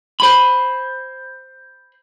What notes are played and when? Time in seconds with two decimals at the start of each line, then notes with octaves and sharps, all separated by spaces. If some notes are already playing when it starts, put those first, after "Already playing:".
0.20 C5 B5